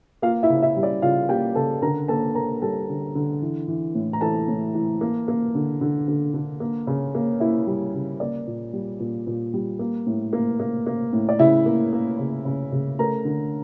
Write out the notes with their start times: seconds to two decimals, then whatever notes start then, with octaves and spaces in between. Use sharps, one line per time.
0.22 A#3 F4 F5
0.43 E4 E5
0.49 C#3
0.63 E4 E5
0.77 G3
0.83 D5
1.02 C#3 F4 F5
1.29 A#3 G4 G5
1.55 C#3 A4 A5
1.82 D3 A#4 A#5
2.08 A#3 A4 A5
2.35 A#3 A#4 A#5
2.62 G3 A4 A5
2.89 D3
3.15 D3
3.42 E3
3.68 E3
3.95 A2
4.13 A#5
4.21 E3 A4 A5
4.48 A2
4.74 E3
5.01 A#3
5.28 A#3
5.55 D3
5.81 D3
6.08 D3
6.34 D3
6.60 A#3
6.87 C#3
7.15 A#3
7.40 A#3 E4 E5
7.67 G3
7.94 C#3
8.20 A#3 D5
8.47 A#2
8.73 G3
9.00 A#2
9.27 A#2
9.54 G3
9.79 A#3
10.07 A2
10.33 A#3
10.60 A#3
10.86 A#3
11.13 A2
11.29 D5
11.39 C#3 E4 E5
11.66 A#3
11.93 A#3
12.19 C#3
12.45 C#3
12.72 C#3
12.99 A3 A#4 A#5
13.25 D3